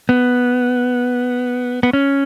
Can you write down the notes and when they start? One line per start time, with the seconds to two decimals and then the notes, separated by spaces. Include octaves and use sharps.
0.09 B3
1.83 B3
1.93 C#4